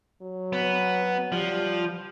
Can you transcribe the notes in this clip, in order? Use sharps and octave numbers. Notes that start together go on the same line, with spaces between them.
F#3
B3
F3 G3